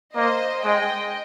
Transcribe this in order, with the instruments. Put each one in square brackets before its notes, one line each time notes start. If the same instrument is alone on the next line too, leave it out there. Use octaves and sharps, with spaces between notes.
[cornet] A#3 [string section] C5 D#5
[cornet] G#3 [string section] D#5 G5